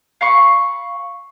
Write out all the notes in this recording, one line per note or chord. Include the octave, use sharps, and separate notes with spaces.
F5 B5 C#6